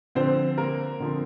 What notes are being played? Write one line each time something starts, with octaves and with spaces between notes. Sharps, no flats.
D3 F3 C4 C5
A#3 A#4
D3 F3 C4